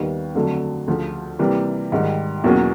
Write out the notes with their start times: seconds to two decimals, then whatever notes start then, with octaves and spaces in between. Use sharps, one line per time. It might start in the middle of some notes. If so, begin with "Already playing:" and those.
Already playing: D#2 D#3 G3 B3
0.35 F2 D3 F#3 A3
0.88 D2 C#3 F3
1.39 C3 E3 G3 A#3
1.92 G#2 D#3 G3
2.44 E2 B2 F#3 A#3 C#4